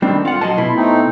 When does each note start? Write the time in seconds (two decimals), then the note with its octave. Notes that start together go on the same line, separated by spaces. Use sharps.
0.02 D#3 G3 C4 D4
0.25 F4 F5 F#5
0.41 F#3 D#5 A5 C6
0.58 B2 E4
0.76 A3 C4 D#4